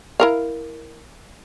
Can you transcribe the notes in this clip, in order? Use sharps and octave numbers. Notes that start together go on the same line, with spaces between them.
E4 A#4 F5